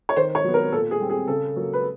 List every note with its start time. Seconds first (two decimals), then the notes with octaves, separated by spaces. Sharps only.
0.09 C#5
0.16 D#3 C5
0.35 C#5
0.44 F#3 B3
0.54 A#4
0.72 A#2 A4
0.91 G#4
1.00 G3 C4
1.10 G#4
1.28 C#3 A4
1.56 F#3 A#3
1.73 B4